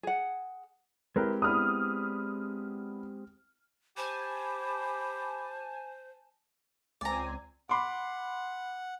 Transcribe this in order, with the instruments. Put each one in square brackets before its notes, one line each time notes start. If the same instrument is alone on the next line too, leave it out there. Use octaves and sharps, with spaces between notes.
[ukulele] G#4 F#5
[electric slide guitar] G#3 C4 G4 [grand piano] E4 A#4 B4
[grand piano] B3 D4 E4 [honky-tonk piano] D#6 F6
[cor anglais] G4 [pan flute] C5 [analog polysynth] G#5 A5 [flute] B5
[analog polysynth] C#2 C4 G#5 [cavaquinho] D5 A#5
[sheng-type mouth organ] F#5 [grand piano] B5 C6 D6